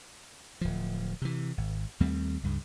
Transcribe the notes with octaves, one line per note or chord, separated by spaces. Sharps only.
D1 F3
C3 E3
G#1
D#2 G3 A3 C4
C#2 G2 C#3